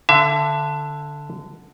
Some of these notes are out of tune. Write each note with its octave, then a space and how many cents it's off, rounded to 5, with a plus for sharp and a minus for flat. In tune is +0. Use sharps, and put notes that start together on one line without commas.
D3 +0 E5 +35